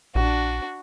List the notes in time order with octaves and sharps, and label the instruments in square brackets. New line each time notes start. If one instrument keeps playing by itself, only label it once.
[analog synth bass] A#1 [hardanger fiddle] D4 F#4